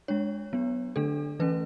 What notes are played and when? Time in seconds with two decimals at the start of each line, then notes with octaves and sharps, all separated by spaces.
0.08 G#3 D4 C#5
0.53 F#3 B3 D4
0.96 D3 A3 D4 A4
1.39 E3 A3 C#4 B4